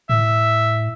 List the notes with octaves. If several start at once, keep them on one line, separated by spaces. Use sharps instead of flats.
A2 E5